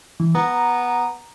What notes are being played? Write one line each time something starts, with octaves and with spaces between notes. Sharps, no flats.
E3
B3 A#5